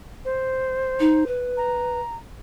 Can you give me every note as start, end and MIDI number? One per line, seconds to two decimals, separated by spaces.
0.25 1.25 72
1.00 1.26 63
1.27 1.99 71
1.57 2.16 82